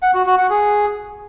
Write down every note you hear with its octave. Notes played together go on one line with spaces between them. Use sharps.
F#5
F#4
F#4
F#5
G#4